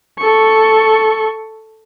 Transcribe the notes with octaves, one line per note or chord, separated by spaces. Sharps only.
A4 C#6